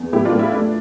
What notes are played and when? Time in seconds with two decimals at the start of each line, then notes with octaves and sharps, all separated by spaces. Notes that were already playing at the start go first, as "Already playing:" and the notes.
Already playing: E2
0.13 A2 E4 G4
0.25 D4 F4
0.32 A2
0.39 E4
0.53 A3 D4